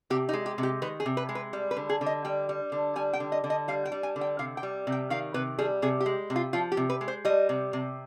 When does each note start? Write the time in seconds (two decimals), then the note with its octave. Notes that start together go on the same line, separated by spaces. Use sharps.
0.10 C3 G4
0.29 D#4
0.33 G#3
0.46 G4
0.58 C3
0.63 G4
0.82 D#3 B4
1.00 G#4
1.06 C3
1.17 B4
1.29 G#3
1.35 B4
1.53 G3
1.71 B4
1.77 D3
1.89 G#4
2.01 D3
2.06 D#5
2.25 G3 G5
2.49 G3
2.72 D3
2.96 G3 G#5
3.13 G5
3.20 D3
3.32 D#5
3.44 D3
3.50 D#5
3.68 G3 F5
3.85 G5
3.92 G3
4.03 G#5
4.16 D3
4.21 G5
4.39 C3 F5
4.57 G5
4.63 G3
4.87 C3
4.92 G5
5.10 D#3 F5
5.34 C3 B4
5.58 G3 G#4
5.82 C3 G#4
6.00 G4
6.06 G#3
6.30 C3
6.36 F4
6.53 F3 F4
6.72 G4
6.77 C3
6.90 B4
7.01 G#3
7.08 C5
7.25 G3 D#5
7.49 C3
7.73 C3